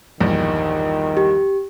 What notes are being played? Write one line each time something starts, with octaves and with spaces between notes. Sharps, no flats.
A#1 E2 G2 D#3
G4